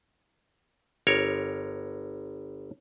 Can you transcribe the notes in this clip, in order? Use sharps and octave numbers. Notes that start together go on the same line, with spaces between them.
G1 A#4 C#5